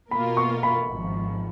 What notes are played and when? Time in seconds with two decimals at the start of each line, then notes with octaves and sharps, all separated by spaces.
0.11 B2 A#3 F4 A#4 B5
0.37 C#6
0.63 B5
0.89 G#1 G#2 F3